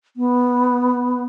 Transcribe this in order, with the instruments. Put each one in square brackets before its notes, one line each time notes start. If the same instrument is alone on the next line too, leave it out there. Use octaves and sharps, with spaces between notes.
[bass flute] B3